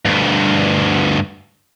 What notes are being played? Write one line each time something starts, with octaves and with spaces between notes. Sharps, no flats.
D2 G2